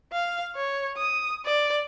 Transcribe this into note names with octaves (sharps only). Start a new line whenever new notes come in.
F5
C#5
D#6
D5